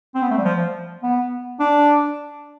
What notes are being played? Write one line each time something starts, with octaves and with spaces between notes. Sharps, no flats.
C4
B3
A3
G3
F3
B3
D4